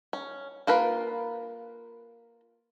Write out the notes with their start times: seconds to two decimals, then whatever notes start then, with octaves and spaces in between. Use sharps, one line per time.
0.13 C#4
0.67 A#3 F4 A#4 B4